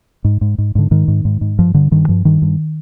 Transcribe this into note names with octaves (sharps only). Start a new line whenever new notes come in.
G#2
G#2
G#2
G#2 D3
G#2 D#3
G#2
G#2
G#2
G2 F3
G2 D3
G2 D#3
G2 F3
G2 D#3
G2